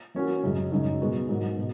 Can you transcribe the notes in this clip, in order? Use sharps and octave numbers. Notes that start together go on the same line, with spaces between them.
E3 A#3 C#4 F#4
F#2 C#3 G#3
F#2 C#3 G#3 D#4
B2 G#3 B3 F#4
G#2 D#3 F#3
B2